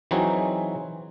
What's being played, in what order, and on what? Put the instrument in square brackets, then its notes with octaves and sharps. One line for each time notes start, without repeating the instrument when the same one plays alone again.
[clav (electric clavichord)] E3 F#3 C4 D#4 F#4 G#4